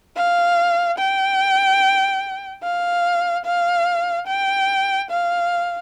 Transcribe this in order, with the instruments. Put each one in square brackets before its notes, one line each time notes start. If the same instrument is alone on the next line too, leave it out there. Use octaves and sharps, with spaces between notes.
[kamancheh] F5
G5
F5
F5
G5
F5